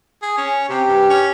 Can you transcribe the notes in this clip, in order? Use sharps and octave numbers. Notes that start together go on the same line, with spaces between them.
G#4
C#4
C3 G4
G2
C#4